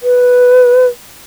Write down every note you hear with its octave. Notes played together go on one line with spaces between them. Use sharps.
B4